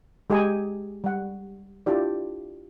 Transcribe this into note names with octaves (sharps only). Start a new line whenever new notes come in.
G#3 G4 G#4 D#5 G#5 A#5
G3 F#5
D4 E4 F4 G4 D5